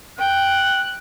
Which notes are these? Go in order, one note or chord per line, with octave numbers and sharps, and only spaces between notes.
G5 F#6